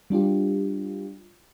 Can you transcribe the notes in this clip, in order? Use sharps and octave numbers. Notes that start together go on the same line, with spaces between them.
G3 D4 F4 G4